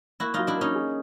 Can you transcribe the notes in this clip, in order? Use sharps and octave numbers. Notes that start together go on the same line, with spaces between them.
A#3 E4 F#4
F#3 D#4 F4
D4 E4
A#3 C#4 D#4
G#4